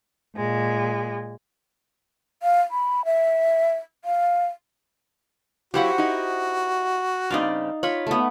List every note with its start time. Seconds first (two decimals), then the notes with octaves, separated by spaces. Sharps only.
0.36 A#2 G#3
2.43 F5
2.71 B5
3.05 E5
4.05 F5
5.74 F#3 E4 F#4 G4 C5 F5 F#5
5.98 D#4 E4 D#5
7.30 G2 C#3 C4 D#4 D5 F5
7.83 F4 C#5 B5
8.07 A3 B3